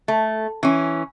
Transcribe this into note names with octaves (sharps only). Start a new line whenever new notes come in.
A3
E3 C#4